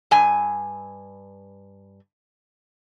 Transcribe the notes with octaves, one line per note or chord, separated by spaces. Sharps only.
G2 G#5